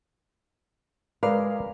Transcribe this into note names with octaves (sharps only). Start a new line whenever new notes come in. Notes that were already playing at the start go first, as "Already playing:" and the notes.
G#3 A#4 B4 D5 F5